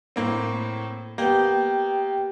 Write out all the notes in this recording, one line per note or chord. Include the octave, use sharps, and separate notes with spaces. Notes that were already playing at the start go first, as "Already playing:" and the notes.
A2 A#3 C4
A#3 B3 G4 G5